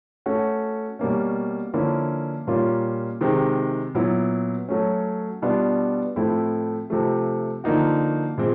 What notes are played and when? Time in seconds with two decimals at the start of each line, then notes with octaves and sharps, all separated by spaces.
0.26 A3 C#4 F#4
0.99 B2 G3 A#3 C#4
1.73 D3 F3 A#3 C#4 E4
2.47 A#2 G3 A#3 C#4 F4
3.21 C3 D#3 G#3 C4
3.95 A#2 F#3 B3 E4
4.69 F#3 A3 C#4
5.42 B2 G3 B3 D4 F4
6.16 A2 F3 A3 C4 E4
6.90 C3 F3 A3
7.64 D3 F3 A#3 D#4 F#4
8.38 A#2 F3 G#3 C4